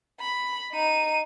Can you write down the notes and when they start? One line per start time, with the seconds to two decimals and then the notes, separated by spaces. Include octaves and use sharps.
0.20 B5
0.72 D#4 D#7